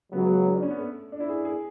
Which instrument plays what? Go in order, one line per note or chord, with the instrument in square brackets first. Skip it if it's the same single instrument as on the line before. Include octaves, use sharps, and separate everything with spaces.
[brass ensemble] C#2 C#3 F#3 [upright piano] B3
[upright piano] C#4
D4
C#4
B3
A3
D4
E4
G#4
G#4